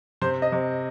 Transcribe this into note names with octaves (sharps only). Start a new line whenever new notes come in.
C3 C5
D#5
C3